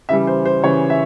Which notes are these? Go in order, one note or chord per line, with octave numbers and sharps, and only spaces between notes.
C#3 E3 G3 E5
C5
C5
C#3 E3 G3 C#5
E5